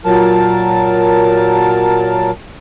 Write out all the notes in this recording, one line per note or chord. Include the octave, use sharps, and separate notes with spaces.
A#2 F#3 A#4 A5